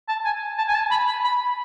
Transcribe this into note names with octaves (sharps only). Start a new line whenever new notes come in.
A5
G#5
A5
G#5
A5
B5
B5
B5